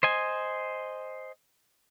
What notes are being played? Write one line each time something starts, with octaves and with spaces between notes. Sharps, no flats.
C5 D#5 G#5